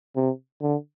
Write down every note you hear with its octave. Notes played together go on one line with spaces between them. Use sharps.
C3
D3